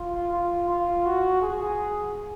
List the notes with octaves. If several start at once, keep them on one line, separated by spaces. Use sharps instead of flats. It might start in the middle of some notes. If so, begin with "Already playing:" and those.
Already playing: F4
F4
F4
F#4
G#4